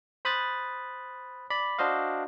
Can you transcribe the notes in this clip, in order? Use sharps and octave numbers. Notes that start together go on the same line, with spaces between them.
C5 B5 D#6 F#6 A6
D5 B5
D4 F#4 C5 D#5 F5